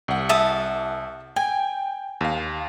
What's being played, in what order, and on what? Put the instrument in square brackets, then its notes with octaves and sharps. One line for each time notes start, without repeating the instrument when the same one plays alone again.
[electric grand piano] C2 F#5
[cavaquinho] E5 A5 D#6
[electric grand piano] G5 [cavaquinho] G#5
[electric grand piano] D#2 F5